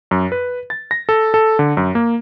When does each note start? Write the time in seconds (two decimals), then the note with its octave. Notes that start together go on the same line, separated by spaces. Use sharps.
0.11 F#2
0.32 B4
0.70 A6
0.91 A#6
1.09 A4
1.34 A4
1.59 D3
1.77 F#2
1.95 A#3